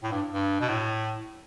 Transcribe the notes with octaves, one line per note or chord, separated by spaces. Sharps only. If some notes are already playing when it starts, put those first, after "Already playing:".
A2
G2
G2
B2
A2